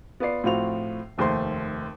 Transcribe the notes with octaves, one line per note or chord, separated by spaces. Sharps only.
B3 F4 D5 C7
A2 F3 C4 F4 F#4 F7
F1 D#2 A3 C5 C6